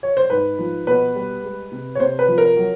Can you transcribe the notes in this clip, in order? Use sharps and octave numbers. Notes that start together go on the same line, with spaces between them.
C#5
C5
G#2 B4
F3
B2 B4
G3
G#3
C3
C#5
C3 C5
B4
F3
A#4
F#3